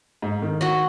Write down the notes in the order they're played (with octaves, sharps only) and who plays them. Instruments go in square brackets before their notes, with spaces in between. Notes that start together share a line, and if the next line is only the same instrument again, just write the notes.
[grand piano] G#2
D#3
[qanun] F#4 D#5